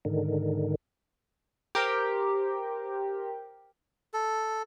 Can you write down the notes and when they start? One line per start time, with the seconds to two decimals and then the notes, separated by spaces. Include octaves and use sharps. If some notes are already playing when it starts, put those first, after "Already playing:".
0.05 G#2 D3 D#3
1.75 G4 A#4 C5
4.14 A4